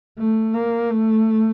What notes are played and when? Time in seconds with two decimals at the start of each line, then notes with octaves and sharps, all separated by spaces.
0.18 A3
0.54 A#3
0.90 A3